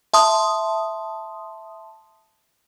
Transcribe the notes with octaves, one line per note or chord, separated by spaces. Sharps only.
E5 A5 C6 D#6